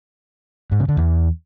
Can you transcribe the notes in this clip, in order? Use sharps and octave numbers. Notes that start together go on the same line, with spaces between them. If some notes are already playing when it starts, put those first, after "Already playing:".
G#2
C#3
D3
E2